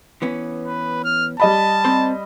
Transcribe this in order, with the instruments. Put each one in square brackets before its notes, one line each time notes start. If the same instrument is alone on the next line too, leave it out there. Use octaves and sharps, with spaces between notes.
[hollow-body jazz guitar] E3 B3 C#4
[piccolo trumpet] B4
F6
[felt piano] G3 D#5 B5 [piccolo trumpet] A5
[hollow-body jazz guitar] C4 C5